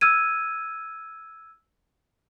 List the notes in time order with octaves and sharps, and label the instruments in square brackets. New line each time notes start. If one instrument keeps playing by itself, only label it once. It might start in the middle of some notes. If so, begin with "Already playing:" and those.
[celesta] E6 F6 G#6 D#7